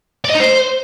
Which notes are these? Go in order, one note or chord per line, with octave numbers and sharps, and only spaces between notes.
D5
D#5
D#4
C5